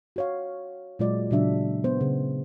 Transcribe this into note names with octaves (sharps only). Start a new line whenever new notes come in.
F#4 C#5 F5
A#2 F#3 G#3 F4 D5
A#2 C#3 F#3 D4 E5
B3 C5
C#3